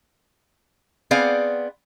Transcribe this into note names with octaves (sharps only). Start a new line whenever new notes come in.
B3 C4 G#4 D5 F5 F#5